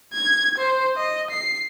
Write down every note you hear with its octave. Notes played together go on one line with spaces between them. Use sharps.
G#6
C5
D#5
C7